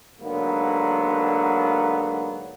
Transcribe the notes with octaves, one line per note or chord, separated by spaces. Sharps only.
G#2 D3 F#3 A#3 B3